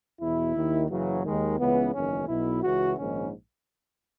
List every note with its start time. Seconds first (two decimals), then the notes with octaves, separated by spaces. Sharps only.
0.20 E2 B2 E4
0.55 D#2 D#3
0.89 F#1 F#2 C#3 E3 F#3
1.24 D#2 D#3 G#3
1.59 C#2 C#3 E3 B3
1.93 F#1 E2 D#3 C#4
2.28 B1 B2 E4
2.62 C#2 C#3 E3 F#4
2.97 A#1 G#2 D#3 C#4